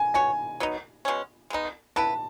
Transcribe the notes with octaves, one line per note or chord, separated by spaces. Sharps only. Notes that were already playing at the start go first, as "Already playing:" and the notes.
Already playing: G#5
B3 F#4 C#5 G#5
F#3 B3 D#4
B2 G#3 C#4
G#3 B3 D#4
B3 E4 B4 A5